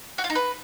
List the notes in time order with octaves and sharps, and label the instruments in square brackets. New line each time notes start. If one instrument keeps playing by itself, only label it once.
[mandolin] F#4
F4
D#4
B4